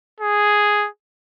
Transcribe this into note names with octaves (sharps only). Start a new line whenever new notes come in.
G#4